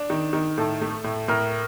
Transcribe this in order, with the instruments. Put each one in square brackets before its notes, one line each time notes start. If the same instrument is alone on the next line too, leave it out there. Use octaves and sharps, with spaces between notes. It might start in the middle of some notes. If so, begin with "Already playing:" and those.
Already playing: [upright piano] D4
D#3
D#3
[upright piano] A2 [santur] A4
[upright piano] A3
A2
[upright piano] A2 [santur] A#4